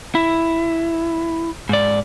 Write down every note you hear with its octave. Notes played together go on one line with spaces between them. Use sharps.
E4
G#2 D5